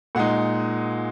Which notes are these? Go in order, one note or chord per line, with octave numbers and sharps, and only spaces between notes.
A#2 G#3 D#4 F#5